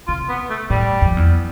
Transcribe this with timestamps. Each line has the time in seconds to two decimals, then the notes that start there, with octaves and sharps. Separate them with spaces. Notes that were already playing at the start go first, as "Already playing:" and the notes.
0.07 C3 F4
0.29 B3
0.50 A3
0.70 A2 G3
1.02 F2
1.17 E2